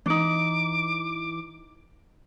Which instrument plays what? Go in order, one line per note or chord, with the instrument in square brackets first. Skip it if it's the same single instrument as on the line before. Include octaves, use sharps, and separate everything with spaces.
[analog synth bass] E3 [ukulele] D4 D#4 [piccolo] D6